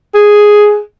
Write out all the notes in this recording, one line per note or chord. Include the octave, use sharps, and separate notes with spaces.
G#4